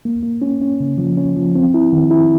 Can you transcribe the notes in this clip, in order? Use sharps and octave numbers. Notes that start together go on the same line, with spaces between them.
A#3
A#3
C#4
C#4
C#3
F3
C#4
F3
C4
E4
D#3
E4